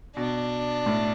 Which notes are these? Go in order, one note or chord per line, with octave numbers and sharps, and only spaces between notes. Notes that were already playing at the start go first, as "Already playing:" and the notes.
B2 D4
A2